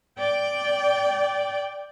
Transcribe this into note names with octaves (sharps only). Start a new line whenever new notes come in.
D5 G5